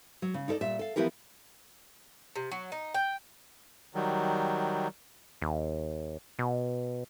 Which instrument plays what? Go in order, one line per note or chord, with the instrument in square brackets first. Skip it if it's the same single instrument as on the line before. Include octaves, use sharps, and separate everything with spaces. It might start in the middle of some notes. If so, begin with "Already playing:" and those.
[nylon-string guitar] F#3
C#3
D#4 E4 A4 D5
A#2 G3 E5
A4 F5
E3 F3 B3 E4 G4 A#4
[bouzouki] C3
F#3
D#4
G5
[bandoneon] D#3 F#3 G3
[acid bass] D#2
B2